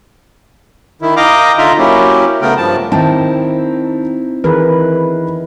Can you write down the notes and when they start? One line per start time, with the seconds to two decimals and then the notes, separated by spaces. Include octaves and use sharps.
1.02 D#3 E4
1.16 D#5 F5 G5 A#5 D6
1.58 D3 D#4 F4 E5 A#5 C6
1.78 F#3 A#3 C#4 E4 G4
2.42 C#3 A3 B3 A#4 G5
2.57 G2 F3 A5
2.92 D#3 C4 D#4 E4 A5
4.44 D#3 E3 G#4 A#4 B4